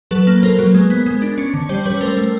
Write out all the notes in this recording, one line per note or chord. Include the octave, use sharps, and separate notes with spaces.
F#3 A4 B4
A#3
A#3 A#4 C5
F#3
G#3
B3
G#3
D4
C#4
D3
G3 C5 D5
G3 B4 C#5
A3 A#4 C5
A3